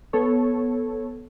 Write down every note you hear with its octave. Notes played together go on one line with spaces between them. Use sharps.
B3 A4 C#5